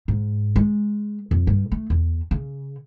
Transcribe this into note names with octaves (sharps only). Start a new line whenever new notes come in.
G#2
G#3
F2
G2
A3
E2
C#3